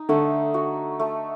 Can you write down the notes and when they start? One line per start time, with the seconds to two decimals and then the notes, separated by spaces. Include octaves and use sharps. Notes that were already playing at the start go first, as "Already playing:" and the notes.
Already playing: D#4
0.09 D3 A3
0.54 F#4
0.99 A3